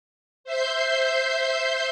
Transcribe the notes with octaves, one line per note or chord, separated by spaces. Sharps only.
C5 E5 C6 G6